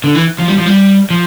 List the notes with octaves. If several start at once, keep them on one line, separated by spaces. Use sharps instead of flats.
D3
E3
F3
G3
F3
G3
F3